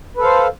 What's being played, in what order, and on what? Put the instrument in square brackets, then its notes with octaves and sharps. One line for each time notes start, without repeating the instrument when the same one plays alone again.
[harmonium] B4
A4
F5
C5